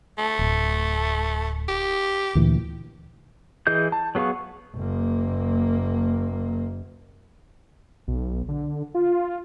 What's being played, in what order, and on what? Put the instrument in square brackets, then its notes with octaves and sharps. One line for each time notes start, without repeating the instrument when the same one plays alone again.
[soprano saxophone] A3
[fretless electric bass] D1
[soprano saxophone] G4
[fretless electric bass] D2 A#2 E3
[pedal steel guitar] E3 G#4 D#5 G6
A5
F#3 B3 G#4 F5 C#6
[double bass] F#1 A#3
[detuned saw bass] B1
D3
F4